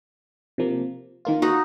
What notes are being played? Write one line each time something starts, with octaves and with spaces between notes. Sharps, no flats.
C3 F3 A#3
D#3 A#3 F4
D#4 F#4